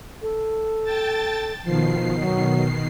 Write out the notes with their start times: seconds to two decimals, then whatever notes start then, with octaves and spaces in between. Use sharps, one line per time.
0.22 A4
0.83 G5 A5 A6
1.64 B2 D#3 F3 C7
2.20 F#3